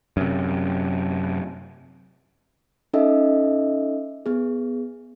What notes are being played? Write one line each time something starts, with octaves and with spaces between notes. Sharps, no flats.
F#2 C3
C#4 D#4 A4 D#5 E5
B3 G#4